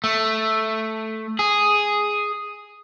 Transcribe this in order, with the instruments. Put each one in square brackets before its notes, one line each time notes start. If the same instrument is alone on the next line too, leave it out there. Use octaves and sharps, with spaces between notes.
[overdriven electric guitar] A3
G#4